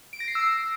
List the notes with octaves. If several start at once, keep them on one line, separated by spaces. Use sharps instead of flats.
D7
A#6
C7
E6